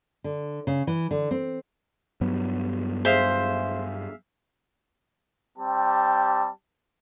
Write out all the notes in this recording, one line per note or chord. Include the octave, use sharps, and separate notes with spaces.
D3
C#3
E3
D3
C4
G2 F#3 B3
G#4 C5 E5 F5
G3 C4 G4 A5